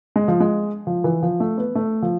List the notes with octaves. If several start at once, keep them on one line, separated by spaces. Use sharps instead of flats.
G#3
F3
G#3
F3
E3
F3
A3
B3
A3
F3